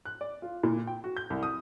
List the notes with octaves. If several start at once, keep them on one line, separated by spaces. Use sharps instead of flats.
F#6
D5
F4
A#2
G5
F#4
G6
C2
D#6